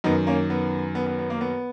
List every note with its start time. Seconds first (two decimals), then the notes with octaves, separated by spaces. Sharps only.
0.04 F#2 D#3 B3 D#4
0.27 A#3 C#4
0.50 B3
0.95 B3
1.06 B3
1.19 B3
1.30 A#3
1.41 B3